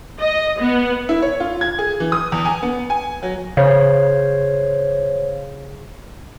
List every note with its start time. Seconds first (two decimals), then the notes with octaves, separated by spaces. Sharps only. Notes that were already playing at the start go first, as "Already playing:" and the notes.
0.19 D#5
0.59 B3
1.09 E4
1.22 C#5
1.40 F4
1.61 G#6
1.79 G#4
2.00 E3
2.12 D#6
2.32 E2
2.45 G#5
2.63 B3
2.90 G#5
3.23 F#3
3.57 C#3 C5 C#5 F5